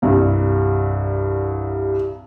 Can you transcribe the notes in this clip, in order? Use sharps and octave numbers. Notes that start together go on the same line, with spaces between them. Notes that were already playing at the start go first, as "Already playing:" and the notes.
C2 G2